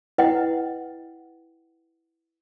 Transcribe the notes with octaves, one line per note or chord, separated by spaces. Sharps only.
E4 B4 D#5 F#5 G5